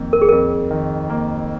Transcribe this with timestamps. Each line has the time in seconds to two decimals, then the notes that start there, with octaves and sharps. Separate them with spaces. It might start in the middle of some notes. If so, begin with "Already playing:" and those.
Already playing: F2 D#3 A#3
0.13 A#4
0.22 G#4
0.29 F2 A#4
0.71 D#3
1.10 A#3